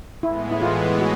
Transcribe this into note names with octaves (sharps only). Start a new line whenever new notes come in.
A2 E3 G#3 B3 E4
E4
F4
F#4